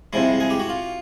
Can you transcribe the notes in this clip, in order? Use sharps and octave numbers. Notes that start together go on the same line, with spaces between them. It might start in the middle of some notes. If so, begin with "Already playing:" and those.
C2 C3 F3 G#3 E4
G#4
G4
F#4
F4